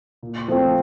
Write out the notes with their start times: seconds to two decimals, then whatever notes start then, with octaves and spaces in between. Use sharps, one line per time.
0.23 A#2
0.48 F3 A3 C4